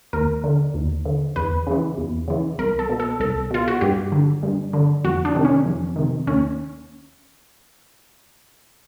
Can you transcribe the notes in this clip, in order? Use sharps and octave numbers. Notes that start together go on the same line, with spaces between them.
D#2 A#4
D3
D#2
D3
E2 B4
C#3 E3
E2
C#3 E3
C2 A#4
A4
B2
A4
C2 A4
B2 F4
F#4
G2 G4
D3
G2
D3
F2 F#4
D4
C3 D#3
C#4
F2
C3 D#3
D#2 C#4